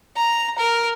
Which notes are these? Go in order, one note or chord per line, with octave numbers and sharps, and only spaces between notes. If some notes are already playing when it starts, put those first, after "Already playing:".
A#5
A#4